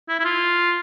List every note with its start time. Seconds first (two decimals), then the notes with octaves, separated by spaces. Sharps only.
0.09 E4
0.19 E4
0.25 F4